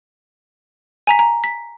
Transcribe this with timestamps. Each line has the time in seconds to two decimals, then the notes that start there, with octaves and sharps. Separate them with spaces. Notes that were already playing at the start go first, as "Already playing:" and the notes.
1.07 G#5 A#5 B6
1.19 A#5
1.44 B6